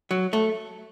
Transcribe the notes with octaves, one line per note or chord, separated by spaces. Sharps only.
F#3
A3